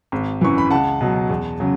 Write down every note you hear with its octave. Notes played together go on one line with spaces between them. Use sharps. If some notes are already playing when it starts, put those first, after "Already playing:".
G#1
F#2 E3 C#6
B5
C#2 F#5 A5
B2 F#3
E2
C#3 F#3